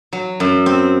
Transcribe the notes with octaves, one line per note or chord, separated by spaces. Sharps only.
F#3
F#2
C4